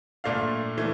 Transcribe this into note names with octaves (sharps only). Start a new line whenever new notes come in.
A#2 A3 D4 F5
E3 A3